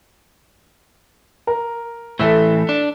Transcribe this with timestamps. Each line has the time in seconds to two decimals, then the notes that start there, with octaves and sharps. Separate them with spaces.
1.47 A#4
2.19 A2 E3 A4 E5
2.69 D4